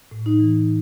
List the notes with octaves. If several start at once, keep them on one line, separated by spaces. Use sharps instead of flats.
A2
D#4
E3